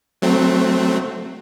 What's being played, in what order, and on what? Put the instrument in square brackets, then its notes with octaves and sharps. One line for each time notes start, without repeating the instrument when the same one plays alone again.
[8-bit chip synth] F#3 A3 C4